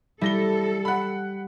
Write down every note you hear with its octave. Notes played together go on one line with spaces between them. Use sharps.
G3 E4 A4 A#6 G7
F#5 B5